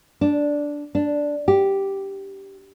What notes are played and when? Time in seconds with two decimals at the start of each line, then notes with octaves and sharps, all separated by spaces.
0.21 D4
0.95 D4
1.48 G4